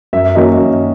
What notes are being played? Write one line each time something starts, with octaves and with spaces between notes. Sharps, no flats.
F#2 E5
D#3 F#3 A#3 C#4 D#5
F#2